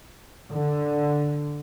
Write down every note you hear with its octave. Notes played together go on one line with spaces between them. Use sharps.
D3